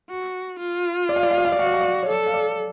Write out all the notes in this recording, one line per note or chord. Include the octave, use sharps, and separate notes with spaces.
F#4
F4
D5
F5
D5
F5
D5
F5
D5
F#4 F5
D5
F5
D5
C#5
A4 D5
F5
D5